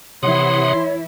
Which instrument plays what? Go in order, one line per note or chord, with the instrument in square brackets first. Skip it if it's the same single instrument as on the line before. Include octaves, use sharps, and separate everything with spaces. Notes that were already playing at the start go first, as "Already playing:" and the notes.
[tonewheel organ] C3 F#5 D#6 [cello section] E3 E4 [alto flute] C#5 [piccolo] C6